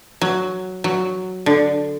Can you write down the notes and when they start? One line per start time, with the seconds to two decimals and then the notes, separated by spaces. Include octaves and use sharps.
0.21 F#3
0.84 F#3
1.46 D3